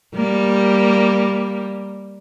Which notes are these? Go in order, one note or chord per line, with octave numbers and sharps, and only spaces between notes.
G3 A#3